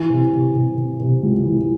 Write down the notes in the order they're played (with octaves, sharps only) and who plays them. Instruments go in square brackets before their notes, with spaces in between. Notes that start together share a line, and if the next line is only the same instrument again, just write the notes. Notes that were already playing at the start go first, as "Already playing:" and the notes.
Already playing: [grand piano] E3
C3
C3
C3
C3
C3
C#2
E3